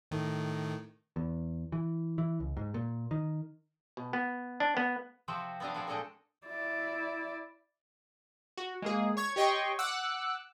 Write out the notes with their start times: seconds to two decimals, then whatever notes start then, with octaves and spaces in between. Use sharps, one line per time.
0.11 A2 D#3 A3
1.16 E2
1.72 E3
2.18 E3
2.40 C#2
2.57 G#2
2.74 A#2
3.11 D#3
3.97 B2
4.13 B3
4.60 D4
4.77 B3
5.28 C3 F3 C4 F#4 C5
5.60 B3 C4 D4 D#5 F5
5.74 F3 C4 F#4 G#4 D5
5.87 A#2 G#3 D4 A4 D#5 G5
6.46 E4 D5
8.57 F#4
8.82 G#3 A#3 G#4
9.17 C#5 C#6 G#6
9.36 G4 C#5 D#5 G5 C6 C#6
9.79 F#5 D6 E6 F#6